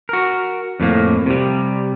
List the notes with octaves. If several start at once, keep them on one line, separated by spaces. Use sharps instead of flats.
F#4 A#4
F2 A2 A#3
C3 G3